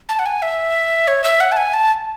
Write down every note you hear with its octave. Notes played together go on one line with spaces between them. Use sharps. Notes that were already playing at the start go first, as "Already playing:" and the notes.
A5
F#5
G#5
E5
C#5
E5
F#5
A5
G#5
A5